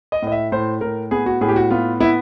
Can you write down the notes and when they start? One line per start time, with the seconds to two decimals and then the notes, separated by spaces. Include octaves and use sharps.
0.12 D#5
0.22 A2 D#5
0.32 E5
0.52 A2 C5
0.81 A2 A#4
1.11 B3 G#4
1.26 F#4
1.41 A2 G#4
1.48 G4
1.56 F#4
1.70 B3 F4
2.00 B3 E4